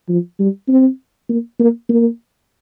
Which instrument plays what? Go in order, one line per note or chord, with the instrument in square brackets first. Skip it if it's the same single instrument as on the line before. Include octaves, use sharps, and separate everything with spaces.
[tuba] F3
G3
C4
A#3
A#3
A#3